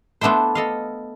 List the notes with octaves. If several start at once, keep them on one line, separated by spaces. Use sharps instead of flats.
A3 B3 D4 E4 C5
A4 D#5 F5